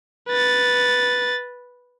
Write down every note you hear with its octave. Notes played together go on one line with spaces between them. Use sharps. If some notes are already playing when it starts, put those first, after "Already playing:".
B4 A6